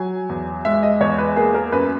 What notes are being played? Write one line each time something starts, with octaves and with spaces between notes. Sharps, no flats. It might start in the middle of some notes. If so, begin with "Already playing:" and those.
Already playing: F#3 G#5
E2
G#3 E5
D#5
E2 C#5
B4
A#3 G#4
A#4
F#2 B4